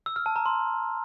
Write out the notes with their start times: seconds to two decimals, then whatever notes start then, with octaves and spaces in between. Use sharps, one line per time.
0.06 E6
0.16 F6
0.26 A5
0.36 A#5
0.46 C6